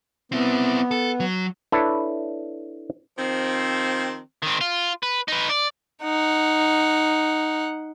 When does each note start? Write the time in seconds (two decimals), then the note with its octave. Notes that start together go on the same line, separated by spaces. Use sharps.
0.32 B3 C4 E4
0.91 A4
1.20 F#3
1.72 D4 E4 A4 B4 C#5
3.18 D#3 F3 C4
4.42 D#3 C4
4.61 F4
5.03 B4
5.28 D#4 B4
5.50 D5
6.02 D#4 F#5